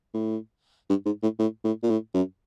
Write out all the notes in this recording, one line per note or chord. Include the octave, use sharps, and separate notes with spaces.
A2
G2
G#2
A2
A2
A2
A#2
A2
F#2